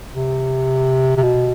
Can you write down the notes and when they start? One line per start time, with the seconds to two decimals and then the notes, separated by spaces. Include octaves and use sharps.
0.14 C3
1.17 C3
1.23 B2